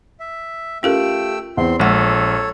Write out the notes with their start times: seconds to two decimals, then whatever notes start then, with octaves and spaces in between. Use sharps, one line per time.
0.20 E5
0.83 A3 C#4 F4 G4 A4 A#4 G5 E6
1.57 E2 C4 C6
1.80 A#1 G#3 A4 C#5 F#5 E6